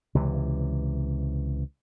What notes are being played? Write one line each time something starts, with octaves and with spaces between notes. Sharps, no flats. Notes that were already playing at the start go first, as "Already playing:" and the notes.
C#2 C3 E3